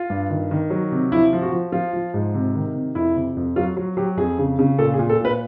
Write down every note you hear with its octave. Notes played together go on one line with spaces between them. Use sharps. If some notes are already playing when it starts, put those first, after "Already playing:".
Already playing: F4
G2
D#3
D#3
F#3
C3
F3 E4
F3
F#4
F3
F3 F4
F3
G#2
C3
D#3
C3
F2 E4
C3
F2
F#3 F4
F#3
F#3 G4
F2 G#4
C#3
C#3
A#2 A4
G#4
A#2
A4
A#2 B4